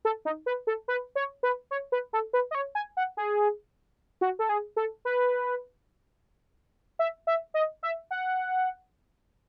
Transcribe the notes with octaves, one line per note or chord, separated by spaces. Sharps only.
A4
D#4
B4
A4
B4
C#5
B4
C#5
B4
A4
B4
D#5
C#5
G#5
F#5
G#4
F#4
A4
G#4
A4
B4
E5
E5
D#5
E5
F#5